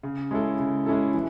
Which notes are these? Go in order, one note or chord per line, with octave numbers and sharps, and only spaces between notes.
C#3
G#3 C#4 E4 A4
C#3
G#3 C#4 E4 A4
E3